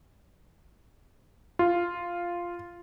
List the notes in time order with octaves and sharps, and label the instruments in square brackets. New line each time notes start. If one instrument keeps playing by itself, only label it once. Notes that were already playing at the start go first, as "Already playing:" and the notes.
[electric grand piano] F4